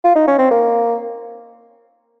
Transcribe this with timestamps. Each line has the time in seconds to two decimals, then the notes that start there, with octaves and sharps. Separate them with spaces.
0.04 F4
0.15 D#4
0.27 C#4
0.38 C4
0.51 A#3